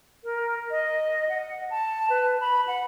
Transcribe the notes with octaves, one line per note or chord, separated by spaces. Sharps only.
A#4
D#5
F#5
A5
B4
B5
F#5